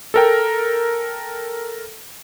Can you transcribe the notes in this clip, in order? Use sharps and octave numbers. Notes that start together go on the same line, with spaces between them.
A4 A#4 G5